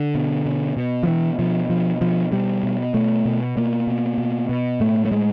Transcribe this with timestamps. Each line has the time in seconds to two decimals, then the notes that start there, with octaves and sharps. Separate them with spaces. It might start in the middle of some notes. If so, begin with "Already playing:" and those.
Already playing: D3
0.15 B2
0.46 B2
0.77 B2
1.03 F3
1.07 B2 E3
1.39 B2 F3
1.70 B2 F3
2.01 B2 F3
2.32 B2 G3
2.63 B2
2.94 B2 A3
3.25 B2
3.57 B2 A#3
3.87 B2
4.18 B2
4.49 B2
4.80 A2 A3
5.05 A3
5.11 A2 G#3